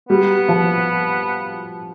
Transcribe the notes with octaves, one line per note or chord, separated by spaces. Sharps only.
G3 B3
F3